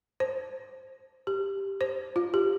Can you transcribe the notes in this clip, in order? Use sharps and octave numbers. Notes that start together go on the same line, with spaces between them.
C5
G4
C5
F4
G4